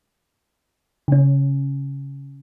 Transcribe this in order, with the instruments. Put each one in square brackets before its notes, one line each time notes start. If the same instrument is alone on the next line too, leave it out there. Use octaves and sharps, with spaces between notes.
[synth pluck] C#3 C#4